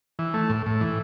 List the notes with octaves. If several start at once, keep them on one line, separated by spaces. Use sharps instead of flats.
E3
A3
A2
A2
E3